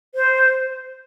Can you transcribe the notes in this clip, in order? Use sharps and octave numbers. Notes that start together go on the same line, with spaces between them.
C5